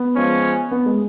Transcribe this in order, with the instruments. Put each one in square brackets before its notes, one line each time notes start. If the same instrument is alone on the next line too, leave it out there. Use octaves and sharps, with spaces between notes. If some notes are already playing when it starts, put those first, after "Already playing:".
Already playing: [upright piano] B3
[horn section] F3 G#3 C#4
[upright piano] B3
G#3